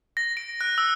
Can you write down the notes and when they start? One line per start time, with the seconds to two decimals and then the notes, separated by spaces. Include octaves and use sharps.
0.17 A#6
0.37 D7
0.61 F#6
0.78 E6